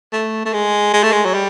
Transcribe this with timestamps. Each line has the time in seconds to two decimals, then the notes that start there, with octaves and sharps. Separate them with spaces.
0.12 A3
0.45 A3
0.53 G#3
0.94 G#3
1.03 A3
1.12 G#3
1.25 F#3
1.34 G3